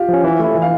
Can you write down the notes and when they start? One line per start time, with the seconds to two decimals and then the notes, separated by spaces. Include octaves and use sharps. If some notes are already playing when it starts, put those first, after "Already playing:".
Already playing: F4 G4 F5
0.09 F3 C#4
0.24 E3
0.40 A3 E4
0.55 E3
0.62 F5